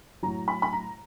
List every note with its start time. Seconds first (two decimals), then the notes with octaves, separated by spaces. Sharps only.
0.23 A2 F#3 A#5
0.48 B5
0.62 B5
0.73 A#5